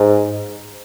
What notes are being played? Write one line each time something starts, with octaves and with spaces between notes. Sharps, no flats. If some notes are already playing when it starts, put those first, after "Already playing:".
Already playing: G#2